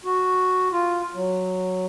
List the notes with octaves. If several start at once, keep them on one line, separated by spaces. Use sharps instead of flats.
F#4
F4
F#3